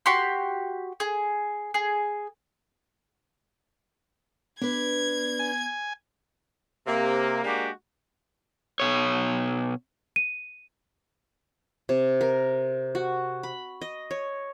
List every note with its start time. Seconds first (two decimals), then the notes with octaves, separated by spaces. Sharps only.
0.06 F#4 G4 C6
1.00 G#4
1.74 G#4
4.62 B3 D4 B4 G#6
5.39 G#5
6.87 C3 A#3
7.44 G#3 A#3 D4 F#4 G4
8.80 B2 C#5
10.16 D#7
11.89 C3
12.21 A#4
12.95 F#4
13.43 B5
13.81 D#5
14.11 C#5